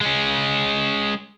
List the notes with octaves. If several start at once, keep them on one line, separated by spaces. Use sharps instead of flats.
G#3 C#4